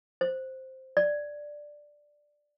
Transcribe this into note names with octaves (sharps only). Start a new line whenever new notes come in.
C5
D5